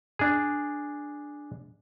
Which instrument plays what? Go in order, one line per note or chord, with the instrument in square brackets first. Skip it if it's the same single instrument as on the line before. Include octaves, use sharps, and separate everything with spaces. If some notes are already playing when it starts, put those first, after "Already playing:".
[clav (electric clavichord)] D4 G#4